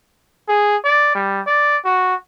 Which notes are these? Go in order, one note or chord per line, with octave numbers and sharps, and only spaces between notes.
G#4
D5
G3
D5
F#4